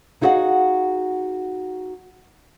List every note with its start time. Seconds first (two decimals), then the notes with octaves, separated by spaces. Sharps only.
0.21 D#4 E4 F#4 G#4 F5 F#5